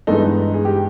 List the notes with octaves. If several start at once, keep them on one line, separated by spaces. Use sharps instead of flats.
G2 E3 G#3 B3 D#4 A4
G#4
G4